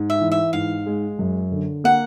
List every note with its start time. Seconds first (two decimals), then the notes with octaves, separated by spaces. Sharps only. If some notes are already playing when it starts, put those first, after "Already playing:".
Already playing: G#2
0.10 E5
0.21 E3
0.32 E5
0.53 G#2 F5
0.86 G#3
1.19 F#2
1.52 D3
1.84 A#3 F#5